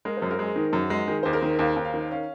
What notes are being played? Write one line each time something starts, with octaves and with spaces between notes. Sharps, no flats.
G#3 A#4
C5
F#2
A#4
G#3 G#4
D#3 D#4
F#2
F#4
G#3
D#3 G#4
D#2 C5
A#4
D#3
D#2 F5
D#2
F5
D#3
C#4 F5